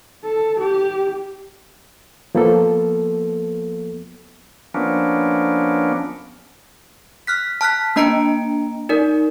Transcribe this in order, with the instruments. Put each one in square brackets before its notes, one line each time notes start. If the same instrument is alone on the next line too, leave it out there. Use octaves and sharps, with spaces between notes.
[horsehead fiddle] A4
G4
[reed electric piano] F3 A#3 B3 A4
[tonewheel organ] F3 A#3 B3 C#4 D4
[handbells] F6 F#6 B6
A5 F6 F#6 B6
A#3 D4 D#5 A#5 C#7 D7
D#4 A#4 D5